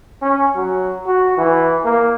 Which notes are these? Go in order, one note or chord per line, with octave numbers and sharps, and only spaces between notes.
C#4
F#3
F#4
E3
A#3